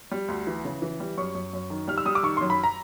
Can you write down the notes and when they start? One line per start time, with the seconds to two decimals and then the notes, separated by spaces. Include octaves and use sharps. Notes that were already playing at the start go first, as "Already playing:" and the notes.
0.11 G3
0.28 D2
0.47 E3
0.65 C#3
0.82 E3
1.00 G3
1.17 F#2 C#6
1.35 F#2
1.53 F#2
1.70 D#3
1.88 G3 F6
1.98 E6
2.05 G3 D#6
2.15 D6
2.23 D#3 C#6
2.37 F#2 C6
2.50 B5
2.64 A#5